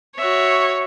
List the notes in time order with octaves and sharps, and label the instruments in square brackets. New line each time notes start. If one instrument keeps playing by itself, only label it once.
[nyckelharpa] F#4 E5 [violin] C#5